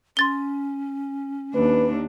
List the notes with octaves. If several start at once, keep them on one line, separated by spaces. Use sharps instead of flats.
C#4 C6 A6 G7
D#2 D4 B4